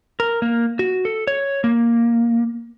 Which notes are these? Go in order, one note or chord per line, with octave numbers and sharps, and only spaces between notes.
A#4
A#3
F#4
A4
C#5
A#3